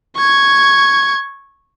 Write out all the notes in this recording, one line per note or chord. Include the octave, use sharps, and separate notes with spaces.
C#6 G#6